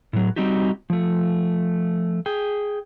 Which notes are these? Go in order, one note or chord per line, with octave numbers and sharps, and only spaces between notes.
A2 F#3
G3 C4 D#4 F#4 G4
F3 A3
G#4 G5